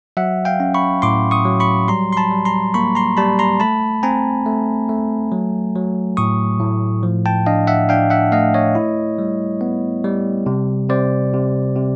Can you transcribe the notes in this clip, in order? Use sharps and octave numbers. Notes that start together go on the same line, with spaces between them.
F#3 E5 F#5
F5 G5
C#4
B5 C#6
A2 C6 D6
C#6 D#6
F#3
B5 C#6
G3 A#5 C6
C6
A5 B5
G3
A#5 C6
A#3 B5 C#6
A#5 C6
G3 A5 B5
A#5 C6
A3 A5 B5
C4 G#5 A#5
A3
A3
F#3
F#3
A2 C#6 D#6
A2
F3
G5 A5
D4 D#5 F5
E5 F#5
D4 F5 G5
E5 F#5
A3 D#5 F5
C#5 D#5
E4
G3
B3
G3
C3
C3 C5 D5
C3
C3